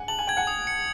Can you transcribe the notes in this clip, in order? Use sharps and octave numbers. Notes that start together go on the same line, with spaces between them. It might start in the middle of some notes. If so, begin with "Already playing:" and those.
Already playing: F#5 G#5
A5 F#7
G#5
G5 G#6
F#5 G#5
D#6
C#7